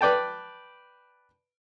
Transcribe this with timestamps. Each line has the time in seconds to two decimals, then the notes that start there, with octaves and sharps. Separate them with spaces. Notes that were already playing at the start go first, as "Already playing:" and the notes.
0.01 B4 D5 G5 A5